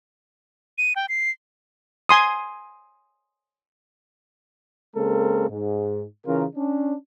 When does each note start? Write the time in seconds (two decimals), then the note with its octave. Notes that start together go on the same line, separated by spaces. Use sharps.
0.78 D#7
0.96 G5
1.09 C7
2.09 G#5 C6 D#6
4.95 C#3 G#3 A#3 C4 A4 A#4
5.49 G#2
6.26 C#3 E3 C#4 F4 A#4
6.56 C#4 D4